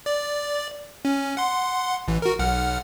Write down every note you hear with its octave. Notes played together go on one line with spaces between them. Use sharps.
D5
C#4
F#5 C6
A1 E3
F#4 A#4
B1 F#5 F6